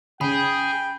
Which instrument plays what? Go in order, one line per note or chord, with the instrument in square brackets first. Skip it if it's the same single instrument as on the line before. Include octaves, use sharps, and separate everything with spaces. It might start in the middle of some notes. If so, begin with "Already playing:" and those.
[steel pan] C#3 [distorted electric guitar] G#4 [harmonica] G5 [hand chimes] B5